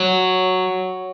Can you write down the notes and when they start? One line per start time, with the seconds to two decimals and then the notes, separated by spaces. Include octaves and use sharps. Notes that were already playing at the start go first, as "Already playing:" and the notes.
Already playing: F#3